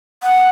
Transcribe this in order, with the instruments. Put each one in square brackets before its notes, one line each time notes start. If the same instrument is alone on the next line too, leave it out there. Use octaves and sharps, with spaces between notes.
[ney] F#5